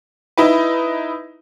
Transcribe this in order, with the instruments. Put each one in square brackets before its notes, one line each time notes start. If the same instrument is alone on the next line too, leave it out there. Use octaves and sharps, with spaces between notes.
[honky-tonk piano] D#4 E4 B4